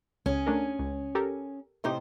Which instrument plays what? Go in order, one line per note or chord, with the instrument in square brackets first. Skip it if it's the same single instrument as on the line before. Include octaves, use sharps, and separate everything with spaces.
[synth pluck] C#2 [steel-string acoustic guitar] C#4 G#4
[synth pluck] A3 D4 A#4
C#2
G4 A4 A#4
[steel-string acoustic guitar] A2 C3 C5 [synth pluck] A3 D#4 G4